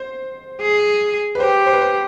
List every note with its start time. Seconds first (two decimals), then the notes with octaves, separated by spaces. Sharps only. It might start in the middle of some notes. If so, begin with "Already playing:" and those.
Already playing: C5
0.61 G#4
1.35 B4
1.40 G4 C5
1.66 C5
1.73 B4
1.81 C5